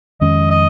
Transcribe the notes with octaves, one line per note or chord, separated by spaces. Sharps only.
F2 D#3 G#3 C#4 D#5
D#5